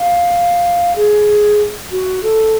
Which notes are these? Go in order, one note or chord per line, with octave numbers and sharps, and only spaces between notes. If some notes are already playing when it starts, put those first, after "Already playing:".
Already playing: F5
G#4
F#4
A4